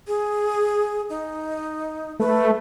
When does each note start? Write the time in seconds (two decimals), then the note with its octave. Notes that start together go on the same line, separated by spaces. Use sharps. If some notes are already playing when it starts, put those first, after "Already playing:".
0.07 G#4
1.09 D#4
2.20 A3 B4